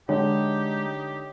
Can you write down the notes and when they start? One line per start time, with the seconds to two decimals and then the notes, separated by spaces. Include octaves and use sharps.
0.09 D3 G#3 D#4 G4 C#5